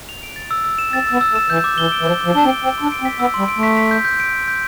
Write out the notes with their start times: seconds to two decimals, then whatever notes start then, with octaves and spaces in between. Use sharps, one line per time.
0.09 F7
0.23 D7
0.36 A6
0.51 E6
0.65 E6
0.78 E7
0.93 C4 A6
1.07 E6
1.12 B3
1.21 E6
1.31 A3
1.35 E7
1.50 E3 G6
1.64 D6
1.78 E3 G7
1.92 D7
2.01 E3
2.07 F3 G6
2.21 F3 D6
2.35 D4 G7
2.44 C4
2.49 D7
2.63 C4 E6
2.78 D4 C6
2.92 D7
3.01 C4
3.05 B6
3.19 B3 E6
3.34 G3 C6
3.48 D7
3.58 A3
3.63 B6
3.77 B6
3.91 G6
4.05 G6
4.20 D7
4.33 B6
4.48 G6